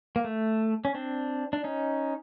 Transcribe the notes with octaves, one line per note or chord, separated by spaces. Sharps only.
A#3
A3
C#4
C4 D4
D4
C#4 D#4